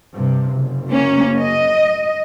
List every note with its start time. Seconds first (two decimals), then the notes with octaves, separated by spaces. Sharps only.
0.14 G2 C3
0.53 F#1
0.91 A#3 C#4
1.38 D#5